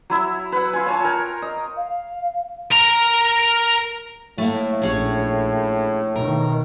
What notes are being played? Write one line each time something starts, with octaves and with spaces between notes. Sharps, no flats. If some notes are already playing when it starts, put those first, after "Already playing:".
F#3 E4 E5
B4 F#5
F4 G#5
C#5 G#5 A5
A#4 G5
D#5
F5
A#4 A#5
A2 A3 A#3
A#1 C#4 G#4 C#5
B2 D#3 A#4